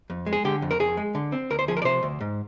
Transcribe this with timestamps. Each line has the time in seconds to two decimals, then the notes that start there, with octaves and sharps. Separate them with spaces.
0.10 F2
0.26 G#3
0.33 G#4
0.45 D3 G4
0.62 F2
0.71 A#4
0.79 F2 G#4
0.97 G#3
1.15 D3
1.32 C4
1.50 D2 A#4
1.59 C5
1.68 F3 G#4
1.77 A#4
1.82 D5
1.85 C3 C5
2.03 D2
2.21 G#2